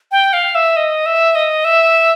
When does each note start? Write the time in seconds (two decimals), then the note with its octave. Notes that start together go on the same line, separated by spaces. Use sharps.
0.12 G5
0.33 F5
0.55 E5
0.77 D#5
1.06 E5
1.35 D#5
1.65 E5